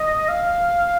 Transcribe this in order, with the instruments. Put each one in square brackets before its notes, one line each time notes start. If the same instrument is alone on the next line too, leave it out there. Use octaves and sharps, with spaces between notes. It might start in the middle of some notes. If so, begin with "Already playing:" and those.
Already playing: [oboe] D#5
F5